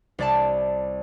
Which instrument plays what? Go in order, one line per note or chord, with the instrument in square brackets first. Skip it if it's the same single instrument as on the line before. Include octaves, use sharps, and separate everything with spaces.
[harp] C2 D5 A5